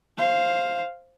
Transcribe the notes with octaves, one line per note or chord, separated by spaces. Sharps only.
C5 F5